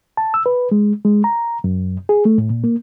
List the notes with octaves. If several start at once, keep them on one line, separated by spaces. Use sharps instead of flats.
A5
E6
B4
G#3
G#3
A#5
F#2
G#4
A3
A2
A#2
A#3